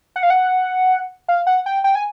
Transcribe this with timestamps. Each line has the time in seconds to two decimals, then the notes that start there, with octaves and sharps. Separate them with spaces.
0.16 F#5
0.23 F5
0.30 F#5
1.28 F5
1.47 F#5
1.66 G5
1.84 G5
1.95 G#5